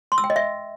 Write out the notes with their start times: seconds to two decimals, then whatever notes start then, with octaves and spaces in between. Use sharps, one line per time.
0.12 C6
0.18 E6
0.24 G5
0.30 D#5
0.36 E5